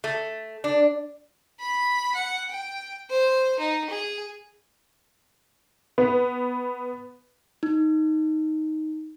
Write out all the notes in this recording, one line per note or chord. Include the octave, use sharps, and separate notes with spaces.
A3
D4
B5
F#5
G5
C5
D#4
G#4
B3
D#4